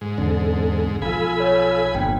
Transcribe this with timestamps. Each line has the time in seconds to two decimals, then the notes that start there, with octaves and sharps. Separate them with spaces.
0.01 G#2
0.18 E2 D3 C4 A4
1.02 B1 F3 A4 F5 G#5 B5 E6
1.40 C#5
1.95 G1 F2 A#2 B3 G5